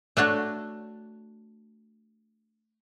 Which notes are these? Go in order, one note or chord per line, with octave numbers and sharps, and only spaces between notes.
A3 D4 F#4 C#5